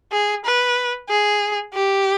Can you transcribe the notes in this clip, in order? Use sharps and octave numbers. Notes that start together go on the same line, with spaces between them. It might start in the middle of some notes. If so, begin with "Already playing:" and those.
G#4
B4
G#4
G4